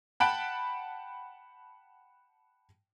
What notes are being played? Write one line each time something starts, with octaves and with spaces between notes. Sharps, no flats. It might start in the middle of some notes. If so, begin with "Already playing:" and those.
F#5 G5 A5 B5 F#6 D7